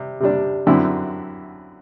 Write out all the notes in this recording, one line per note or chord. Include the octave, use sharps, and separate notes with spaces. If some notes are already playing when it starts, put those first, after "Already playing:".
Already playing: C3 G3
C3 G3 D4
F#2 D3 F#3 C4 E4